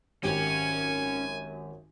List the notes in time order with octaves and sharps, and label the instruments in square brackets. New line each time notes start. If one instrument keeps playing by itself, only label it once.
[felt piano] G#1 G4 [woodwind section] F#2 [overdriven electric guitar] C#4 [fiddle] G#5